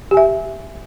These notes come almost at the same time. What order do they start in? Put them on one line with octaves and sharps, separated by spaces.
G4 G#5 E5